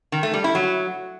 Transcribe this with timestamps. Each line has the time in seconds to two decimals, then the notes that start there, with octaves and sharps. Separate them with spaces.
0.12 D#3
0.23 A3
0.34 G3
0.44 E4
0.55 F#3